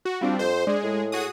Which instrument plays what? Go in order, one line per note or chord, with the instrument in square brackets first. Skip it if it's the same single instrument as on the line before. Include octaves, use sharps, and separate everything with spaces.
[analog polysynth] F#4
[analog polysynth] G3 C4 D4 [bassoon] F4
[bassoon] F2 [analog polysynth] C5
[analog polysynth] G#3 G#4 [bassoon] D4
[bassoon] A2
[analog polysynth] F#4 G#4 D#6